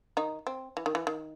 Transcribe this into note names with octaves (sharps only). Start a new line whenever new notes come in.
D#3 D#4
C4
E3
D#3
E3
D#3